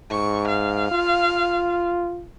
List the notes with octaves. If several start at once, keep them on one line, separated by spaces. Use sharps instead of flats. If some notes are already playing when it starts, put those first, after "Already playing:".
G#2 C#6
F5
F4